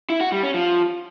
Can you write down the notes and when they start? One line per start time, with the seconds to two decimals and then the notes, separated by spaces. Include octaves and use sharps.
0.10 E4
0.21 F#4
0.32 G3
0.43 C#4
0.54 F3